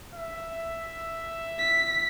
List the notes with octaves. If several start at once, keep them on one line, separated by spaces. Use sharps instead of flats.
E5
B6